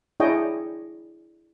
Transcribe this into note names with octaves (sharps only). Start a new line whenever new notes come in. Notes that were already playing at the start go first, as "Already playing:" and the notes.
D4 E4 G#4 C#5 D#5 G5